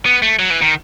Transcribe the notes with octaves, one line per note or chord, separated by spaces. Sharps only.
B3
A3
F#3
E3
D#3